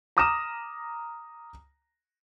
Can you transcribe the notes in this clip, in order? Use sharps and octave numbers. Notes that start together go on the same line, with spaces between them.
A#5 D6 D#6 F6 A#6 E7